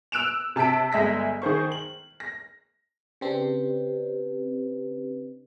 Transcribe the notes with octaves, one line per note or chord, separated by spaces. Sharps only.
E6 F#6 D7 E7 F7
C3 A5 E6 B6 D7
G1 G#3 E5 A#6 B6
D#3 G#4 C5 C#6
F#7
A#6
C#3 C4 D4 G4 B4